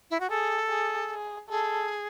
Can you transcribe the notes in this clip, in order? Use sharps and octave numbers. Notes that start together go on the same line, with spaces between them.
E4
F#4
G#4 A4
G#4
G#4
G#4 A4